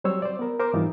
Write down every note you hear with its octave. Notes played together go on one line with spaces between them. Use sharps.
F#3 G3 C4 C5 C#5 E6
C5 D5
B3 A#4
A#4 C5 D6
G#2 E3 G3 C4 D#4 F4